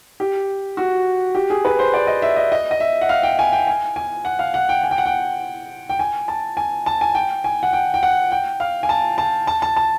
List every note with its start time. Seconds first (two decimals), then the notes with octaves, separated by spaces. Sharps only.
0.20 G4
0.77 F#4
1.35 G4
1.50 G#4
1.65 B4
1.79 C5
1.94 D5
2.07 D#5
2.22 E5
2.36 D#5
2.52 D#5
2.71 D#5
2.80 E5
3.02 F#5
3.09 F5
3.23 G5
3.39 G#5
3.52 G5
3.67 G#5
3.96 G#5
4.25 F#5
4.39 F5
4.54 F#5
4.69 G5
4.84 G#5
4.91 G5
4.98 F#5
5.06 G5
5.89 G5
5.99 G#5
6.28 A5
6.57 G#5
6.86 A5
7.01 G#5
7.15 G5
7.44 G#5
7.63 F#5
7.73 G5
7.94 G5
8.03 F#5
8.32 G5
8.60 F5
8.83 G#5
8.89 A5
9.18 A5
9.47 A5
9.62 A5
9.76 A5